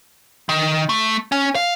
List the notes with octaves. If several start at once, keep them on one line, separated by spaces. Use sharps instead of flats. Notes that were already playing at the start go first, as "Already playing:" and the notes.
D#3
A3
C#4
F5